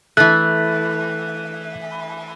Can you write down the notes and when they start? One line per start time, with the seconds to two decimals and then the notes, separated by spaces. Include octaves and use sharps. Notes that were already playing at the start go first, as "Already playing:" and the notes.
0.17 E3 A3 F#6